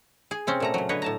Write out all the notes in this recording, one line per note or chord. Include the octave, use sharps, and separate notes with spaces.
G#4
C3 C4 C#4
A#2 A3 A#5
C#3 F#3
D3 B4 C#5 D#5
A2 A5 A#5